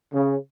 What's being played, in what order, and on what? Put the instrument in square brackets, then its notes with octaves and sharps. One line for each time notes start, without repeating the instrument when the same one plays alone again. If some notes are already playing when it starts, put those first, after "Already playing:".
[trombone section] C#3